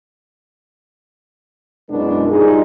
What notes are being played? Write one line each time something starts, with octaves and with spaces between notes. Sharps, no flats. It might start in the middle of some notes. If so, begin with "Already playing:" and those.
F#2 B2 G#3 D4 E4 A#4
G3 D4 D#4 F4 G#4